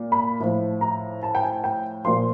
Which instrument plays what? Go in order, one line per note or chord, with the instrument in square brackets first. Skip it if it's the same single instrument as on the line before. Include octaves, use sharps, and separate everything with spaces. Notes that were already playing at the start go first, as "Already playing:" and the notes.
Already playing: [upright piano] A#2
B5
A2 F3
A#5
A5
G5
G#5
G5
A#2 F3 C6